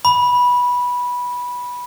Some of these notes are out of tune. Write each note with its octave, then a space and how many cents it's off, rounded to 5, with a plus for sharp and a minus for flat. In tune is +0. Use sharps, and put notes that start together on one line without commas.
B5 -15